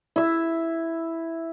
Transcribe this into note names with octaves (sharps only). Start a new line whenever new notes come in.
E4 E5